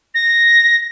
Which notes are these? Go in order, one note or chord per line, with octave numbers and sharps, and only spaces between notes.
A#6